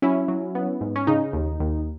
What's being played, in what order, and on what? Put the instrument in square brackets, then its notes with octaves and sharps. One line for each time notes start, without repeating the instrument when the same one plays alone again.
[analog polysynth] F#3 C#4 E4
F#3
B3
G#2
C#4
C#3 D#4
D#2
D#2